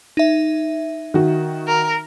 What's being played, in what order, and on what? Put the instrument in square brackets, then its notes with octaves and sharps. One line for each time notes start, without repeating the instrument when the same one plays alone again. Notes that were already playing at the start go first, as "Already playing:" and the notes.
[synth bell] D#4 E5
[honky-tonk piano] D#3 F#4
[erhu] A#4